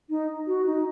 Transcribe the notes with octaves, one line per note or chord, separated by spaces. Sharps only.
D#4
F#4
D#4